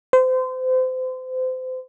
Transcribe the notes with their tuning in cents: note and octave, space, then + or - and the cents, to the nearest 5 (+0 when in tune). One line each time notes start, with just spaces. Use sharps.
C5 -30